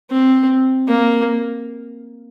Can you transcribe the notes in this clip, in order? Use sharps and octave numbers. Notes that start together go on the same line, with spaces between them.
C4
A#3